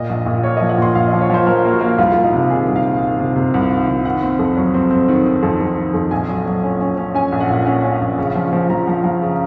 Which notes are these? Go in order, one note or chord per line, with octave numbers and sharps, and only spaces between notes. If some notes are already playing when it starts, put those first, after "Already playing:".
Already playing: A#2 D#5
A#1
A#2
A#3 C#5
F3 D#5
F#5
A#2 C6
A#1 F5
F3 D#5
C#5
F3 C5
F3 A#4
A#3
F#4
A#3
C2 F4
C2 F4
D#4
C3 F4
D#3 G#4
C2
F5
D#3
D#3
C3
C3
C2
D#3
C2
D#3 F#5
C4
F2
F#3
C4
C4
D#3
D#3
F2
F2
D#3
F2
A#1 G#5
F#3
F#3
C#4
C#4
C#4
C#4 G#5
A#1
F#5
A#2
C#4 F#5
C#4
A#1
C#3
F3
F3
F3 A#5
F3
F3
C#3